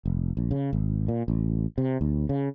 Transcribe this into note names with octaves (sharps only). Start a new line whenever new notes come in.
F1
A#1
C#3
G#1
A#2
A1
C3
D2
C#3